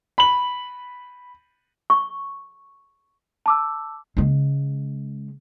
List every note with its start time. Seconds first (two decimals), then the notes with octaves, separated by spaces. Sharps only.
0.18 B5 F#7
1.90 C#6
3.46 A5 D6 E6
4.17 C#3 G#3